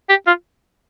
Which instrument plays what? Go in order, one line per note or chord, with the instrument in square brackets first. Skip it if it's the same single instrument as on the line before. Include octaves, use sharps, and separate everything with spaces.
[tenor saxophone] G4
F4